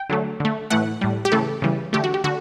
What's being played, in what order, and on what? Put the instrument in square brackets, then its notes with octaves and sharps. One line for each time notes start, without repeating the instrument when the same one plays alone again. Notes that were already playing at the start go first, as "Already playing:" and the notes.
Already playing: [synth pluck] G5
D3 F#3 A3
D3 A3
A2 E3 A3 F#5
A2 G3
G4
C#3 E3 A3 A4
C#3 E3 G3
D3 A3 G4
F#4
G4
D3 F#4